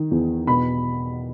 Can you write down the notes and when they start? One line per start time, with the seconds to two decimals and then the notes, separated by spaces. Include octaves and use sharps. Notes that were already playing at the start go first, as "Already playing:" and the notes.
Already playing: D#3
0.11 E2
0.47 B2 B5